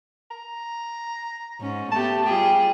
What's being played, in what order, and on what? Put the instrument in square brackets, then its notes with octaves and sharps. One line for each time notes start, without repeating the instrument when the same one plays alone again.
[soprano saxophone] A#5
[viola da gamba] G#2 C#4
[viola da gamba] A3 B3 G4 [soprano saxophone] A5
[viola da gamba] G3 F4 G#4 [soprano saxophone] G4